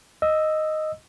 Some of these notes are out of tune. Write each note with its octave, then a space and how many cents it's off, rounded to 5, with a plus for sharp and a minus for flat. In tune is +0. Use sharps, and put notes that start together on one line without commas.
D#5 +0 E6 +0